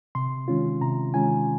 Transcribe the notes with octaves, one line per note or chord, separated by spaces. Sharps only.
C3 C6
D#3 G#3 C#4 F4
C3 A#5
D#3 G#3 C#4 F4 G#5